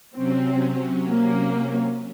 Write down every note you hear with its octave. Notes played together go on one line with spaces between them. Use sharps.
C3 F#3 C4 C#4
A#3